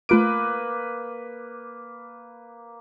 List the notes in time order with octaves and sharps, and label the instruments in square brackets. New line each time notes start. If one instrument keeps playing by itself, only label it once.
[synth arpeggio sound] A3 F4 D7 [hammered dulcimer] A#3 B4